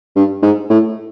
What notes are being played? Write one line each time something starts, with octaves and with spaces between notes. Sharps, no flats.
G2
G#2
A2